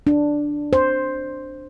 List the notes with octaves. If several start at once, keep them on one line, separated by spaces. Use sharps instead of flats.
D4
C5